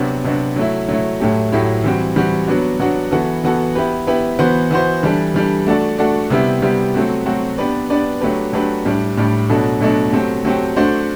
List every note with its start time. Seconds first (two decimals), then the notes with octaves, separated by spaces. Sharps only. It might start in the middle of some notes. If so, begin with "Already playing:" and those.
Already playing: C3 F#3 B3 D4 F#4
0.24 C3 F#3 B3 D4 F#4
0.56 F#3 A3 E4
0.88 F#3 A3 E4
1.20 A2 F#3 A3 E4 G4
1.52 A2 F#3 A3 E4 G4
1.84 E3 G3 C4 F#4
2.16 E3 G3 C4 F#4
2.48 F#3 B3 D4 F#4
2.80 F#3 B3 D4 F#4
3.11 E3 B3 F#4 A4
3.44 E3 B3 F#4 A4
3.75 B3 E4 G4 B4
4.07 B3 E4 G4 B4
4.39 E3 B3 F#4 C5
4.71 E3 B3 F#4 C5
5.03 E3 G3 D4 A4
5.34 E3 G3 D4 A4
5.67 A3 D4 F#4 A4 D5
5.98 A3 D4 F#4 A4 D5
6.30 C3 G3 B3 E4 G4
6.62 C3 G3 B3 E4 G4
6.94 F#3 A3 C4 F#4
7.26 F#3 A3 C4 F#4
7.58 B3 D4 G4 B4 D5
7.90 B3 D4 G4 B4 D5
8.21 F#3 A3 D4 G4 B4
8.53 F#3 A3 D4 G4 B4
8.85 A2 G3 D4
9.17 A2 G3 D4
9.49 B2 F#3 A3 D4 A4
9.81 B2 F#3 A3 D4 A4
10.13 F#3 A3 C4 G4
10.45 F#3 A3 C4 G4
10.76 A3 D4 F#4 C5